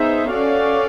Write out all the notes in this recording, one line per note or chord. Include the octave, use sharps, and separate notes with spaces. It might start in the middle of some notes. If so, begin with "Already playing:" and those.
Already playing: B3 D#4 G#4 C5 E5
C#4 F#4 A4 D5 F5